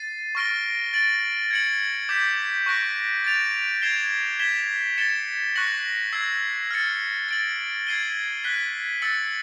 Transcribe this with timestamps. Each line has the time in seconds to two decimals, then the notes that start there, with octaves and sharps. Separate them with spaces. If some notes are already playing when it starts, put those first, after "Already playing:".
Already playing: A6 C7 D#7
0.35 C#6 F6 A#6 D7 G7
0.93 A6 D7 F#7
1.51 G#6 C#7 F#7
2.09 D6 G6 B6
2.66 C#6 F#6 A#6 D7
3.24 A6 D7 F7
3.82 G#6 C7 E7 G7
4.39 G#6 B6 E7 G7
4.98 A6 C#7 E7 G7
5.56 C#6 F#6 A#6 C#7 F#7
6.12 E6 G#6 C7
6.71 F6 A6 C#7
7.28 A6 D7 F#7
7.87 G#6 C7 D#7 G7
8.44 F#6 B6 D#7 G7
9.02 E6 A6 C#7 F#7